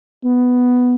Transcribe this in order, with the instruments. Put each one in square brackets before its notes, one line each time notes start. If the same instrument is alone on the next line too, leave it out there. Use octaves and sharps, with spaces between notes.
[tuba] B3